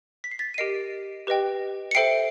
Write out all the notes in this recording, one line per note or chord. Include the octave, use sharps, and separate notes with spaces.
B6
C7
A6 B6
D#7
G4 A#4 D#5 C7 D7
G4 B4 D#5 G5
C#7
A4 C5 E5 G5 C7 D7